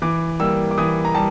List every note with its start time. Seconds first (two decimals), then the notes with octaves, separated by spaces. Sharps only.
0.02 E3 D6
0.40 G3 A#3 E6
0.71 D6
0.78 E3 D#6
1.05 A#5
1.15 G3 A5